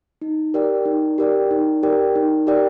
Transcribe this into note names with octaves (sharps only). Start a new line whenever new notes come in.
D#4
G4 A#4 D5 G5
D#4
G4 A#4 D5 G5
D#4
G4 A#4 D5 G5
D#4
G4 A#4 D5 G5